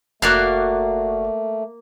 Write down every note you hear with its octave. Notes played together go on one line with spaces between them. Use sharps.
F1 A3 A#3 F#4 D5 F5 F#6